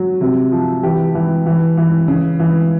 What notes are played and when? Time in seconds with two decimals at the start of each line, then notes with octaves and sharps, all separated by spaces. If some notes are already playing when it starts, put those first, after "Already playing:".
Already playing: F#3
0.21 C3
0.52 F3
0.83 E3 G4
1.15 E3
1.46 E3
1.77 E3
2.08 C#3
2.39 E3